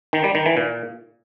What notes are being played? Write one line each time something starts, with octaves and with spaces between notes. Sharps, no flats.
D#3
G3
D#3
E3
A#2